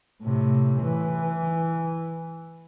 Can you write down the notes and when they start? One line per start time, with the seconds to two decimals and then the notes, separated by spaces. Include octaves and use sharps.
0.23 A2 C3
0.82 E3